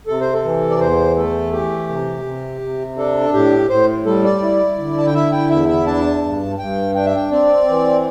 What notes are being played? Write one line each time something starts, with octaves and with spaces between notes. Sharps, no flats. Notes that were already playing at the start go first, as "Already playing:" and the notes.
C3 A4
C5
A4
E3
D5
E2 C5
A3 A4
E3 G4
C3
C3
C3
D4 A4
A2 G4
A2 C5
G3 A4
D5
E4
D3
A5
G5
E4 E5
G5
E2 E5
E5
D4 A5
G2
G2 G5
D4 G5
E5
G5
C4 D5
E3